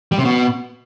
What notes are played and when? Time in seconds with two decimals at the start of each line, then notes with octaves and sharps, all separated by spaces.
0.12 G3
0.18 C3
0.25 B2